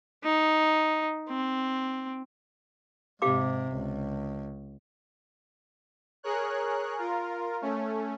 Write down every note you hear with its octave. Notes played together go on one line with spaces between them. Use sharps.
D#4
C4
G#2 C3 G4 F5 D6
C#2
G#4 A#4 C#5 F#6
F4 A#4
A3 C#4